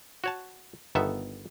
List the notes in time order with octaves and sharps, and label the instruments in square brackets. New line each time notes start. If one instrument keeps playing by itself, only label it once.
[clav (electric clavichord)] F#4 C#5 A5
G1 D#3 B3 A4 E5